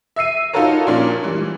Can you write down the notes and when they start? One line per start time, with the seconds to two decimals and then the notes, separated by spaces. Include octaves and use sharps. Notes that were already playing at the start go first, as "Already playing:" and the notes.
0.16 E5 E6 C7 D#7
0.53 D#4 F4 F#4 A4 A#4 C#5
0.87 A#2 F3 A#3 C#4 D4
1.24 E3 G3